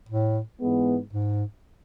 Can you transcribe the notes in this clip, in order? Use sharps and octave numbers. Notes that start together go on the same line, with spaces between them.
A2
G#2 E3 G#3 B3
G#2